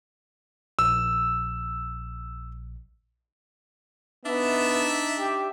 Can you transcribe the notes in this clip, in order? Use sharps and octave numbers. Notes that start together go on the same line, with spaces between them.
A#1 E6
B3 D4 D#4 E5
G4